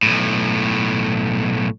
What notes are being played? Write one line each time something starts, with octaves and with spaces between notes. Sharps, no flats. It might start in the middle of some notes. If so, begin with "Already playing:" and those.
B1 A2